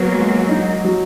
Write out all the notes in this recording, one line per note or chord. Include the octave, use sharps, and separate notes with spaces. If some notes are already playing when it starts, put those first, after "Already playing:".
Already playing: F#3 A#3 B3
G#3
D#4
F#3